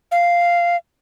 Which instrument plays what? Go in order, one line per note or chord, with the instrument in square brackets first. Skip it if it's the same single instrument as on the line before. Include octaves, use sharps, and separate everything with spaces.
[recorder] F5